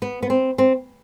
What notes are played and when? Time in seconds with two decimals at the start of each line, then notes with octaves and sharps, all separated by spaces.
0.02 B3
0.23 B3
0.30 C4
0.58 C4